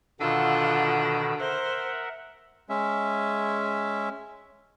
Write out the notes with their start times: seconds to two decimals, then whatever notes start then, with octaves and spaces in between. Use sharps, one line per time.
0.21 B2 D3 D#3 F4 F#5 E6
1.40 A#4 C5 E5 F#5
2.69 G#3 C#4 E5